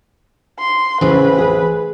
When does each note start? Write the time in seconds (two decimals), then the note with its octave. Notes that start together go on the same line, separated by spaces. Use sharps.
0.59 C6
1.01 A1 C#3 E3 C4 B4
1.38 G#4